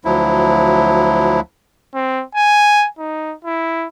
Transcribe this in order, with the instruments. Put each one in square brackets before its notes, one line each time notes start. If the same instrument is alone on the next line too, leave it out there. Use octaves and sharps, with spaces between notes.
[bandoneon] D2 F3 F#3 E4
[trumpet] C4
G#5
D#4
E4